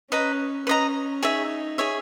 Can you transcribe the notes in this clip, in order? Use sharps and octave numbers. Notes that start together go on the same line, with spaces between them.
C#4 B4 D#5 A#5
C#4 B4 D#5 A#5
D#4 G#4 C#5 E5
G#4 C#5 E5